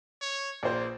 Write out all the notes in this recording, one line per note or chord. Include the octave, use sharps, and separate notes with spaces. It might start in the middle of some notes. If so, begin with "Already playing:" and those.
C#5
A#1 A#3 C5